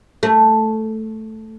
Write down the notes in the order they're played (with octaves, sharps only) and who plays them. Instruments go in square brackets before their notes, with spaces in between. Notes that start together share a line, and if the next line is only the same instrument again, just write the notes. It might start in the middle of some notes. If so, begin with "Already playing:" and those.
[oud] A3